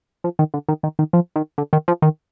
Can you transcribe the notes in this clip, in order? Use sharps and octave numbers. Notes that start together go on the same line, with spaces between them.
F3
D#3
D3
D#3
D#3
D#3
F3
D#3
D3
D#3
F3
D#3